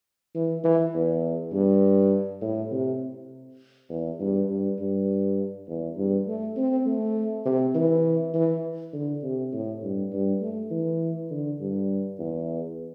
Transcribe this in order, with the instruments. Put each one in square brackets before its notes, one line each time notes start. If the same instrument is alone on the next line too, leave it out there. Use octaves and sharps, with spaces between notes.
[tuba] E3
E3
E2
G2
A2
C3
E2
G2
G2
G2
E2
G2
A3
C4
A3
C3
E3
E3
D3
C3
A2
G2
G2
A3
E3
D3
G2
E2